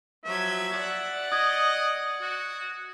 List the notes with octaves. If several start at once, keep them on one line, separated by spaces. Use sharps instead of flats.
F3 F#3 E5 G#6
D5 F#5 A6
D#5 D#6 G#6
F#4